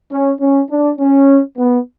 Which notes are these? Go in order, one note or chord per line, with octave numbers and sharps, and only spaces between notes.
C#4
C#4
D4
C#4
B3